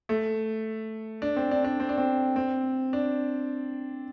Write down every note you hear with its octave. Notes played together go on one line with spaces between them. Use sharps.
A3
D4
C4
D4
D4
C4
D4
C4
C4
D4